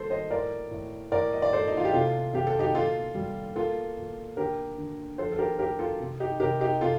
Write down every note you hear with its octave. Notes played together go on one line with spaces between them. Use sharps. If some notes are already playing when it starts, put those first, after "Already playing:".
Already playing: G3 A#3 A4 C5
C5 D#5
A2 A#4 D5
A2
A2 A#4 D5
D#5
D5
A2 A4 C5
D#4
F4
G4
C3 F4 A4
C3 G4
A4
D#4 G4
A#2 F4 A4
G3
A#3 F4 A4
A#2
D3 G4 A#4
D3
F3 A4 C5
A4
G4 A#4
A3 G4 A#4
F4 A4
C3
D#4 G4
C3 G4 A#4
D#4 G4
C3 F4 A4